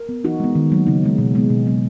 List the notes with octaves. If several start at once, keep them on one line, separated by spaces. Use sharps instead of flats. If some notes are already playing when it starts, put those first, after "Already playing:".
Already playing: A#4
B3
E3 D#4 F#4
G#3 B3
D#3
F#3 A#3
C#3 D#4
G#3 B3
B2
G#3 B3
B2
F#3 B3